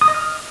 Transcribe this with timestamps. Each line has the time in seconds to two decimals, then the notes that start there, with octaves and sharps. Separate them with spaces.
0.01 D#6
0.08 D#5
0.14 F6